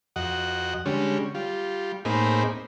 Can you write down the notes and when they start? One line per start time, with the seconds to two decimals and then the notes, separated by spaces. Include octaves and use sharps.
0.16 F2 F#4 D#5 F#5
0.85 D3 G3 G#3 C#4
1.35 G3 F4
2.05 A2 A#3 C4 D#4 G#4 B5